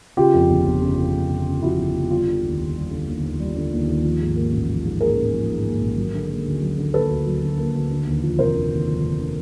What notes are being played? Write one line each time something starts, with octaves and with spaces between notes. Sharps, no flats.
C#3 F4 G4
F2
G1
G1
C#3
F2
G1
G1
C#3
F2 E4 F#4
G1
G1
G3 F4
D3
D#2
D#2
G3
D3
D#2
D#2
G3
D3
D#2
D#2
F3
G#2
A#3
A1
F3
G#2
A#3 G#4 A#4
A1
F3
G#2
A#3
A1
F#3
D3
A#3
D2
F#3
D3
A#3 A4 B4
D2
F#3
D3
A#3
D2
D3
D#2
F3
F1 A#4 C5
D3
D#2
F3
F1
D3